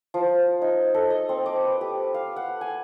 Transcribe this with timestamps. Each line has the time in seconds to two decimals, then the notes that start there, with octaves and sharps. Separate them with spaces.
0.14 F3
0.62 D#4
0.94 A4
1.10 D#5
1.29 C4
1.46 D6
1.64 B4
1.81 G4
2.14 F5
2.36 F#5
2.61 G#5